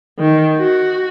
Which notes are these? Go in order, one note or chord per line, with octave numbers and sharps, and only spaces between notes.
D#3
F#4